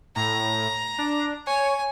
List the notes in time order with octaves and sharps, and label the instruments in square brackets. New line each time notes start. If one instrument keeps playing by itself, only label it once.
[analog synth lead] A2 [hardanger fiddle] A#5
[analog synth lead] D4
[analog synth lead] C#5 [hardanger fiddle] G#5